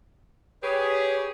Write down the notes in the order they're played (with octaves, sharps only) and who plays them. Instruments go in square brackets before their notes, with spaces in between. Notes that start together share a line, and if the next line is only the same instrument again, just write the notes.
[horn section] G4 G#4 [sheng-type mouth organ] B4 C#5